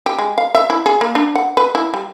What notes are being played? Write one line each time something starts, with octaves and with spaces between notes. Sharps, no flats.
G4
G#3
F5
E5
E4
G#4
A#3
D4
F#5
B4
E4
G3